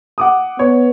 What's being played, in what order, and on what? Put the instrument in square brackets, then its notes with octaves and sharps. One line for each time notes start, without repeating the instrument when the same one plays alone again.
[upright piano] F#5 D6 D#6
[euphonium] B3 [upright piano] C#5